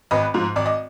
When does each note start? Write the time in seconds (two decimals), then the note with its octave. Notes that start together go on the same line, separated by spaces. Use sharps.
0.11 G#1 B4 D#5
0.34 G#2 F3
0.56 G#1 D5
0.66 D#5